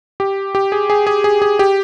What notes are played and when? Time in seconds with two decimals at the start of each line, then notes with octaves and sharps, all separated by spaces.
0.20 G4
0.55 G4
0.72 G#4
0.90 G#4
1.07 G#4
1.24 G#4
1.42 G#4
1.59 G4